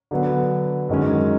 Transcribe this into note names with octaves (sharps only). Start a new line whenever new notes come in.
D3 F#3 B3
F#2 D#3 G#3 C#4